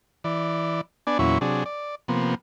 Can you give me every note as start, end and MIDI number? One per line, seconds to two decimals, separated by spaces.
0.24 0.81 52
0.24 0.81 74
1.07 1.18 59
1.07 1.18 62
1.07 1.18 74
1.07 1.18 80
1.19 1.38 40
1.19 1.38 46
1.19 1.38 54
1.19 1.38 61
1.19 1.38 64
1.19 1.38 85
1.41 1.64 48
1.41 1.64 54
1.41 1.64 62
1.41 1.64 68
1.66 1.95 74
2.08 2.35 48
2.08 2.35 53
2.08 2.35 58
2.08 2.35 59